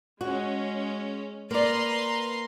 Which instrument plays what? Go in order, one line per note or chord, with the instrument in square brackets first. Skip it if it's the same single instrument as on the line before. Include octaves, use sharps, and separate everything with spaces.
[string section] G#3 C#4 [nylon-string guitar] F#4
[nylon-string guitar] A#3 D5 [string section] B4 A#5 C6